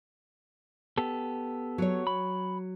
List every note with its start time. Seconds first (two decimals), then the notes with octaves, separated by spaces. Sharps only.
0.98 B3 G4 A4
1.78 F#3 C#5
2.07 B5